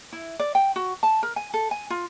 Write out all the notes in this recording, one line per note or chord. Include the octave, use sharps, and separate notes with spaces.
E4
D5
G5
F#4
A5
A#4
G#5
A4
G#5
F4